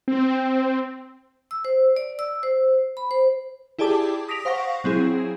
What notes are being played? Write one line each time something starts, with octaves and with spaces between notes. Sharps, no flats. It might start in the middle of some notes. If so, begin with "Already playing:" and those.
C4
E6
C5
D5
E6
C5
B5
C5
E4 G4 G#4 D5 A5 D6
D#6 A#6 B6 D7 F7
C5 F5 F#5 C#6 A#6
F#3 C4 E4 G#4